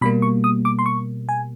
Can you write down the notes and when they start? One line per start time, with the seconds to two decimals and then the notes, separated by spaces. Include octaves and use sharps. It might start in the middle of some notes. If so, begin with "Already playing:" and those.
0.01 B2 G3 A#3 B5
0.22 C#6
0.44 D#6
0.65 D6
0.79 C6
0.86 C#6
1.29 G#5